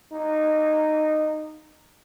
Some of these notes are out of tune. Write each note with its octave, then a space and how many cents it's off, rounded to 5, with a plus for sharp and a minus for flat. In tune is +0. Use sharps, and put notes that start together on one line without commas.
D#4 -15